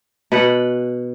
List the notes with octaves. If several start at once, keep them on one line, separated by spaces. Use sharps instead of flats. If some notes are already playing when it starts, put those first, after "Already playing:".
B2 B4 F#5